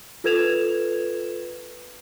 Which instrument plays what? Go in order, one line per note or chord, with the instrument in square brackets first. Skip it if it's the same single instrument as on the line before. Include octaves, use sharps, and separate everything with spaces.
[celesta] F4 A4 B4 G#6 E7 F7